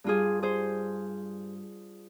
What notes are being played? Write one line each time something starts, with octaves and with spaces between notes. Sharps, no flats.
G2 G3 F4 G#4
G#4 C5